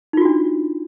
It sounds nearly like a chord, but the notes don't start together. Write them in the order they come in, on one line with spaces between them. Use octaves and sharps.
D#4 F4 F#4 D4